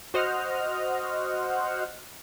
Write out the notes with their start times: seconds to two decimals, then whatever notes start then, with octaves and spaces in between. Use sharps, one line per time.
0.14 F#4 C5 D#5 F#5 F6